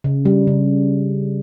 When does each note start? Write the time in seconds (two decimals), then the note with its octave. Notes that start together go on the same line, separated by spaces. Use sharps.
0.04 C#3
0.25 G3
0.47 C#3